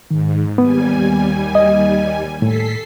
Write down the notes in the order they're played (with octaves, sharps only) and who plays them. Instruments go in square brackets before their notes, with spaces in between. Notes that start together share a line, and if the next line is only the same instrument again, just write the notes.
[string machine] G#2 [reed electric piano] D#3
[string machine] D#2 G3 G#5 [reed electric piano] B3
[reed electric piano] D#5
[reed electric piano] A2 [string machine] A4 B6 C7